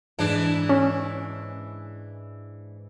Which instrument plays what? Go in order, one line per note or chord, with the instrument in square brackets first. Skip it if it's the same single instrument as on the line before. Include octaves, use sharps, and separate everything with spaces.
[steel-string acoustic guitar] G#2 A5 [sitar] E3 D4
[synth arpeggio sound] C#4